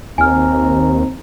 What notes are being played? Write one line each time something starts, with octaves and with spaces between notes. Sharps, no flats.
D#2 C4 G#5 A#5 F6